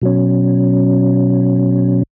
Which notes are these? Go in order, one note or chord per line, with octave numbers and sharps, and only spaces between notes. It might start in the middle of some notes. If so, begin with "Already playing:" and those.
B2 F#3 C#4